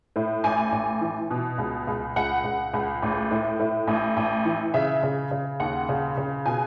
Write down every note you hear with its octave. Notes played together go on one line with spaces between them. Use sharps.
A2
A1 G#5
A1
E3
B2
C#2
C#2
C#2 F#5
C#2
C#2
A1
A2
A2
A1
A1
E3
C#3 E5
C#3
C#3
D#2 F#5
C#3
C#3
B2 G#5